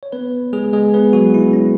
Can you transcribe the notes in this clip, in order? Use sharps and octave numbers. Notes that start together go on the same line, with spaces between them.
C#5
B3 B4
G#3 G#4
G#3 G#4
B3 B4
F#3 F#4
E4
C#4